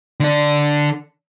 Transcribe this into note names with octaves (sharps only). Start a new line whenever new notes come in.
D3 D4